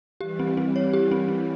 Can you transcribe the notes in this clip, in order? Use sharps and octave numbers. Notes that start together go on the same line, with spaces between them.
E3 G3 G4
C4
C4
C#5
G4
C4
C4